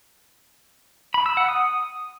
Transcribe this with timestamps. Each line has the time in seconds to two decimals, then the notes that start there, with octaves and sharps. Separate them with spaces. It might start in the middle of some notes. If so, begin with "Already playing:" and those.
1.14 B5
1.26 E6
1.37 F#5
1.48 D#6